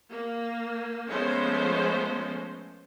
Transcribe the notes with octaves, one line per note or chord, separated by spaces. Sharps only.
A#3
F3 G#3 A3 B3 C#4 C5